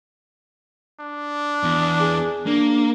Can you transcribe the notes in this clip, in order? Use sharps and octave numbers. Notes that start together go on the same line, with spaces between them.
D4
E2
G#4
A#3 D4